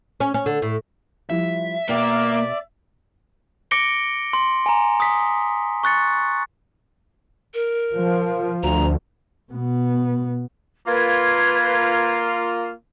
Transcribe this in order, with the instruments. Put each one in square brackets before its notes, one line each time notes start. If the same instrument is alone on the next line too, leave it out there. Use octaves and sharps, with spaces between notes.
[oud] C#4
C#4
D3
A2
[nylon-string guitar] F3 G3 E4 [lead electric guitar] E5
[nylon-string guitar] B2 G5 [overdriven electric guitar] A#3 [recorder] D5
[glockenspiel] D6 A#6 C#7 D7 G7
C6
G#5 A#5
D#6 B6
C#6 F#6 A6 C#7
[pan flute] A#4
[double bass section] F3
[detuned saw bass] D2 [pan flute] A#5
[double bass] B2 B3
[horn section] A#3 F4 [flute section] B4 G#6